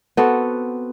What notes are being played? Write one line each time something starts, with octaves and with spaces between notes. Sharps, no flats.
B3 C4 F#4 A4